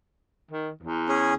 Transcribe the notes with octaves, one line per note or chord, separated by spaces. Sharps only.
D#3
E2
C#4 G#4